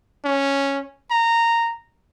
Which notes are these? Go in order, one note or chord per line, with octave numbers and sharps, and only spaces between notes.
C#4
A#5